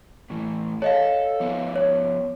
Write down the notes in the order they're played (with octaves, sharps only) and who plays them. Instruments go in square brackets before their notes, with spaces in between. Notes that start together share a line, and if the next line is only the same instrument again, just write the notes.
[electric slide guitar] A2 E3
[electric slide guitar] A4 [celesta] C#5 D#5 F5
[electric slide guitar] F3 B3
[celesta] C#5